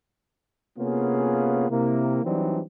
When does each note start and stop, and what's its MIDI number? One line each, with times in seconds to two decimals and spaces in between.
0.78 1.68 48
0.78 1.68 58
0.78 1.68 59
0.78 1.68 61
0.78 1.68 65
0.78 1.68 68
1.70 2.25 48
1.70 2.25 58
1.70 2.25 64
2.25 2.61 52
2.25 2.61 54
2.25 2.61 55
2.25 2.61 60
2.25 2.61 62
2.25 2.61 63